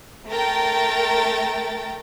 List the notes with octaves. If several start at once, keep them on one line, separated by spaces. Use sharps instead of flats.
A3 A#4 G5 A6